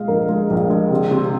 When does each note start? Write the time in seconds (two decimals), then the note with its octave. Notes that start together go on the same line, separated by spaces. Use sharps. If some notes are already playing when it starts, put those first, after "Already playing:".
Already playing: A#2 G#3 D#5 F5
0.08 A#1 A#4
0.29 G#3
0.50 A#1
0.70 G#3
0.90 C3
1.11 C3